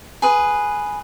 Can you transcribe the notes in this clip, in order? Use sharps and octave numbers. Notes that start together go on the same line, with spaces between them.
G#4 B4